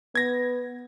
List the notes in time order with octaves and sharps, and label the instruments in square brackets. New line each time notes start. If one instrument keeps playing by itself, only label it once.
[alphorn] B3 [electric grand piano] G#6 A#6